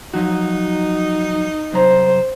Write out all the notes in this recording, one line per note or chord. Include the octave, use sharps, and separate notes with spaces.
F3 F#3 D#4 F#4
C2 F#3 C5 A#5